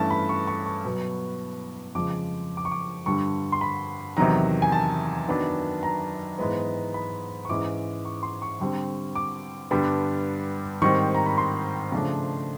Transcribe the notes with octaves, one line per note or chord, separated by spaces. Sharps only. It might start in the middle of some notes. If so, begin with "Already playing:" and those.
Already playing: G2 E3 A3 C#4 A5
B5
C#6
C#6
C#6
B2 F#3 B3
F2 C#3 F3 G#3 D6
D6
C#6
D6
G2 D3 G3 C#6
C6
B5
E2 C3 D#3 F#3 A#5
G#5
A5
F#2 D#3 F#3 B3 D4
A#5
G#2 E3 G#3 B3
B5
C#6
G#2 E3 G#3 C#4 D6
C#6
C6
C#6
D3 G3 C4
D6
G2 D3 G3 B3 D4
G#2 D#3 G3 C4 C#6
A#5
B5
C6
C#3 F3 A3 D4